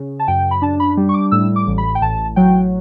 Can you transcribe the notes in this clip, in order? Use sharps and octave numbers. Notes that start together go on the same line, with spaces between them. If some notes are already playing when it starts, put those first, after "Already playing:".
Already playing: C#3
A5
F#2 G5
B5
D4 A5
B5
G3
C#6
D6
A2 E6
D6
A1
B5
G5
A1 A5
F#3 G5